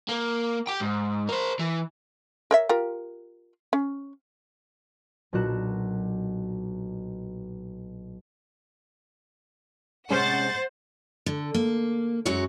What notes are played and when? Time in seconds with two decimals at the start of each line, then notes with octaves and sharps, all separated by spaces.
0.09 A#3
0.67 G4 G5
0.80 G#2
1.29 A#4 C5
1.60 E3
2.51 A#4 C#5 E5
2.69 F4 G4 A#4
3.73 C#4
5.33 B1 A#2 D4 F#4 F#6 E7
10.10 C3 G#3 A3 C#4 C5 F#5 A6
11.26 D3
11.54 A#3
12.25 F#2 F#3 G#3 F#4 C#5